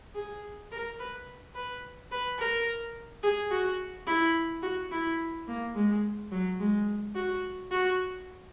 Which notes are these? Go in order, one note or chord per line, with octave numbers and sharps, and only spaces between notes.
G#4
A#4
B4
B4
B4
A#4
G#4
F#4
E4
F#4
E4
A#3
G#3
F#3
G#3
F#4
F#4